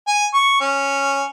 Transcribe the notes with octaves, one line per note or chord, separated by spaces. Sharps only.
G#5
C#6
C#4